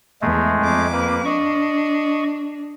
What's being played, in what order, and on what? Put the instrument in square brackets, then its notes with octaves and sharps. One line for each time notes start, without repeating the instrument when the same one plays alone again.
[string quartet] E2 [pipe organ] G#3 A3
[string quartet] F2 D6
[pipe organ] A#3 B4
[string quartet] D4 [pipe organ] D#5 C#6